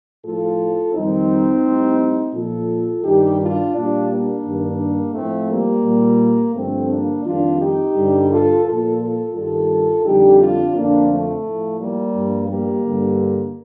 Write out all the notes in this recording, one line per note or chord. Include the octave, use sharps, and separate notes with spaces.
A2 F3 F4 A4
F2 D#3 G3 C4 D#4
A2 G3
A#2 F3 F4 A4
G2 D#3 G3 D#4 G4
D4 F4
A#2 G3 D4 F4
A#3 D4
G2 D#3 G3
A2 F3 A3 C4
G3 A#3
A#2 G3
G2 D3 F3 A3 C4
A#3 D4
F2 D#3 G3 D4 F4
D#4 G4
G2 D3 G3
F4 A4
A#2 F3 F4 A4
F4 A4
G2 D#3 G3 F4 A4
F2 D3 G3 D#4 G4
D4 F4
F2 D3 F3 A#3 D4
A3
A2 F3
G3 A#3
G2 F3
G3 A#3
G2 D3 G3